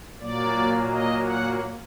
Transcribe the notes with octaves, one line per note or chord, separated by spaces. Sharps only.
A#2 F#3 A#3 D5
D#5
F#5